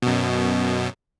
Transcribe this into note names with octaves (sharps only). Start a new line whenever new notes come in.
F#2 B2